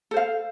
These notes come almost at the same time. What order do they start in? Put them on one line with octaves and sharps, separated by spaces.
A4 C5 F5